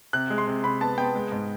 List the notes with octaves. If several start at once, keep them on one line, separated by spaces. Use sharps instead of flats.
C3 F#6
G#3
C6
C3
C3 B5
B3 A5
B3 G5
G#3
G#2